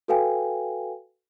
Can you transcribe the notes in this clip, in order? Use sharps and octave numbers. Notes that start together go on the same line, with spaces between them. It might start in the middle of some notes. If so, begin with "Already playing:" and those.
F#4 A4 B4 F5 G5 G#5